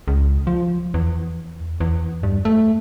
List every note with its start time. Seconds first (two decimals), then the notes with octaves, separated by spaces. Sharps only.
0.08 C#2
0.47 F3
0.94 E2
1.80 E2
2.23 G2
2.45 A3